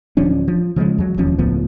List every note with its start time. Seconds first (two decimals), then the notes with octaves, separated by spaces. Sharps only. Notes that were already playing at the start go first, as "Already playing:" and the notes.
0.17 D1 F3 C#4 D4
0.48 F3
0.76 C#3 F3 F#3 G#3
0.98 E2 F#3
1.17 E1 D#2 F3 C#4
1.38 C#2 A2 F3 B3